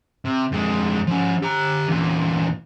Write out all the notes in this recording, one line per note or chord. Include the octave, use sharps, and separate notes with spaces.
C3
F2 G#3
F3 C#4
G4 A#5
E2 A#2